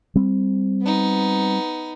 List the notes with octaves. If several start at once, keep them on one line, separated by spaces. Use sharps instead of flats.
G3 C4
B3 D#4